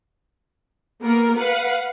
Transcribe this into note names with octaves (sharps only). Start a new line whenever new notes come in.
A#3 B3 A#4
B4 F5 F#5